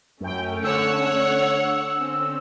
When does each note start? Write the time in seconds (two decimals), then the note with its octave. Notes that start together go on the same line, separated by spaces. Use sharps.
0.20 F#2 A3 C#4 G5
0.63 D3 C#5 F#5 E6
1.98 C4 C#4